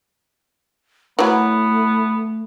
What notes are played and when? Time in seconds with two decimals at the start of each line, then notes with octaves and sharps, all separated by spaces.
1.19 E3 F#3 A3 B3